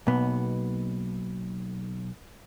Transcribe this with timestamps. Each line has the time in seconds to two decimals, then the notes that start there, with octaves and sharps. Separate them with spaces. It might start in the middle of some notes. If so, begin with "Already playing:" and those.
0.07 B1 B2 A#3 B3